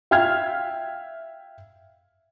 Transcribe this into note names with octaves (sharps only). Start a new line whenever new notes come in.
E5 F5 G5 F6 G#6